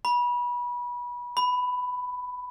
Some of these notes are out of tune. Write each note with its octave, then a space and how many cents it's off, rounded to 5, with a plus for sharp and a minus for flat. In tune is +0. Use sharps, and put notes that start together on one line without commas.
B5 -25
B5 +10